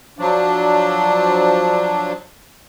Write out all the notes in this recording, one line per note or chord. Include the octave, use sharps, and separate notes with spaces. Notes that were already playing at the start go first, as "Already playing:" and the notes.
F3 F#3 D4